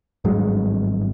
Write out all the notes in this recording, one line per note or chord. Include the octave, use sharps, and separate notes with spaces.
G#1 G2 F#3 G#3